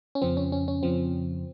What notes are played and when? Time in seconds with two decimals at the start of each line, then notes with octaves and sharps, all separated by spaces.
0.15 C#4
0.22 F2 C#3 F3 C4
0.37 C#4
0.52 C#4
0.68 C#4
0.83 F2 C#3 F3 C4